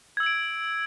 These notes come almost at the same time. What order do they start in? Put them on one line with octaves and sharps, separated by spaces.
G#6 E6 F#7 D7